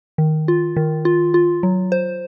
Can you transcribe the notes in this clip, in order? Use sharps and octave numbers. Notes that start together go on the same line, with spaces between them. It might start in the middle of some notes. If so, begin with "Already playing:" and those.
D#3
F4
D#3
F4
F4
F#3
C5